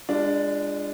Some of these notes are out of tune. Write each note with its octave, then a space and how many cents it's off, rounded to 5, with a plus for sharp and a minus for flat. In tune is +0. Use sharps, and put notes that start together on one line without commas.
G#3 -30 D4 +0 F4 -30